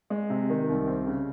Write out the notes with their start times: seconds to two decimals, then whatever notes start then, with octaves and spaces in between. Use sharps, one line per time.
0.10 G#3
0.30 C3
0.50 D#3
0.69 C2
0.87 C4
1.07 C#3